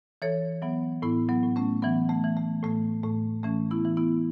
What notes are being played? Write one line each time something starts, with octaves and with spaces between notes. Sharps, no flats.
E3 A4 C#5
E3 F#3 B3
A2 B3 E4
F#3 B3
A2
A3 C#4
E3 F#3 B3
A3
E3
A3
A2 A3
A2 A3
E3 A3 C#4
B3 E4
E3
B3 E4